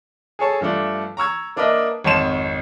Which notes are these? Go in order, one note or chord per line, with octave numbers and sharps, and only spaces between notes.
G#4 A4 C#5 A5
G2 F3 A3 D4
A#5 C#6 E6 G#6
A#3 D4 A#4 B4 D#5 E5
G#1 F2 C#5 A5 C6 E7